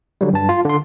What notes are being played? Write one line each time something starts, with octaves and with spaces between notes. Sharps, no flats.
D3 F#3 G3
G2 A5
F4
D3 C6